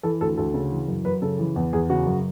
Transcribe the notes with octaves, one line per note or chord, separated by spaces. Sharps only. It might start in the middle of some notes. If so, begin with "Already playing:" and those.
E3 A4
D2 A4
D2 A4
C#3
E3
F#2
F#2 B4
C#3 A4
E3
E2
E2 G#4
C#3 F#4
F#2